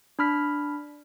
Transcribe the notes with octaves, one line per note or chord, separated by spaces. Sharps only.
D4 B5 F6 B6